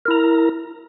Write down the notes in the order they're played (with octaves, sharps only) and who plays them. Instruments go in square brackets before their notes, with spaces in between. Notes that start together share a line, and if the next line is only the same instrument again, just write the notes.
[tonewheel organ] A#4
E4
A#5